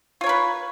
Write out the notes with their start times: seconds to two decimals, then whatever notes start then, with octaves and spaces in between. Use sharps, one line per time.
0.21 F4
0.24 C#5
0.26 A#4
0.29 B4